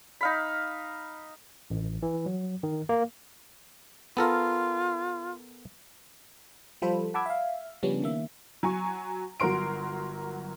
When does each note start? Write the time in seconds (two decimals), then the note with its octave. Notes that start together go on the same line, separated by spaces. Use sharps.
0.21 D#4 F5 B5
1.70 A1
2.03 E3
2.26 F#3
2.63 D#3
2.89 A#3
4.17 B3 F4 A4 A#4
6.82 F3 G3 F4 A4 C5 B5
7.14 F#5 A5 B5 D6 E6 G#6
7.26 E5 F5
7.83 C#3 F3 G3 B3 C#4 D4
8.02 D#3 A#3 E5
8.63 F#3 G#5 C#6
9.40 G1 F#3 F#4 A#4 C6 D7